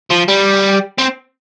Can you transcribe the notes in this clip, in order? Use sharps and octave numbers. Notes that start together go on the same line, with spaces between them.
F3
G3
C4